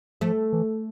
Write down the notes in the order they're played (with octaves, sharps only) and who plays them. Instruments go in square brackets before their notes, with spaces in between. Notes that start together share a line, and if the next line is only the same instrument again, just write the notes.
[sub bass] F3 [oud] A3
[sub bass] E3